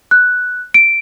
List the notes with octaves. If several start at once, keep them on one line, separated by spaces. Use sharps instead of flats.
F#6
D7